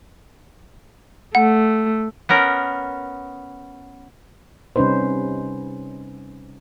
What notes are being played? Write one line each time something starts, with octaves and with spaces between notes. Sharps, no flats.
A3 F#5
B3 C#4 A#4
C3 G3 C#4 D#4 B4 C5